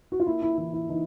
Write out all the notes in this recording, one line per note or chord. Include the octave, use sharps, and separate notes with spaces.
F#4
F4
A#3 E4
E4
E3 E4
E4
E3 D#4